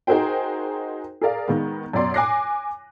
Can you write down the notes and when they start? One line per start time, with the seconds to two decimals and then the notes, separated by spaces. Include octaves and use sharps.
0.07 D#4 F#4 G#4 A#4 C5 G5
1.21 G#4 A#4 D5 F5
1.48 D#3 G#3 B3
1.93 F#2 B2 D5 C6
2.14 G#5 D6 F#6 A#6 C7